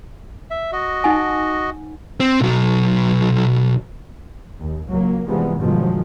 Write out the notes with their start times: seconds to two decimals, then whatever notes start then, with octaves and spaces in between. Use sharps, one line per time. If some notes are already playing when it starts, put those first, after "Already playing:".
0.50 E5
0.72 F#4 D#5
1.04 D#4 F#5 G#5
2.20 C4
2.41 B1 F#3
4.59 D#2
4.89 C#2 F#3 A#3
5.28 C3 E3 F3 G3 G#3 B3
5.59 G2 B2 D#3 F3 F#3 G#3